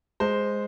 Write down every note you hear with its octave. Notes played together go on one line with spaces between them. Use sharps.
G#3 C5